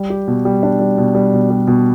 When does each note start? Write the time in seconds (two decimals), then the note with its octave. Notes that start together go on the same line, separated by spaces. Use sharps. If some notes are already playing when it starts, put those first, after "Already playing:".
Already playing: G3
0.10 G4
0.28 B2
0.45 G3
0.63 D4
0.79 G3
0.98 B2
1.15 G3
1.33 B2
1.50 G3
1.67 B2